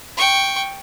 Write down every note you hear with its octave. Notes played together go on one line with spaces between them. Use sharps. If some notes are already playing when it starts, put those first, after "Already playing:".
G5 C#6